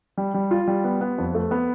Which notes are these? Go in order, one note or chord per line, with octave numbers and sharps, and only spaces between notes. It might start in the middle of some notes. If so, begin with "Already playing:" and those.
G3
G3
F4
G3
B3
B3
F2
A3
B3